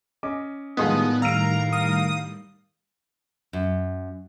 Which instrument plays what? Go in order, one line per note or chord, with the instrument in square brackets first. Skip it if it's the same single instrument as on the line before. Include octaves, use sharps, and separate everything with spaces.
[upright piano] C#4 D#5 D6
[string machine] A2 D#3 G3 [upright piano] F3 G#3 D#4 [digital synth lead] B3 [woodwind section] D#6
[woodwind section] A#4 F5 [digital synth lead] A#5 [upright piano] E6 D7
[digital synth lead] D#6
[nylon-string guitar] F#2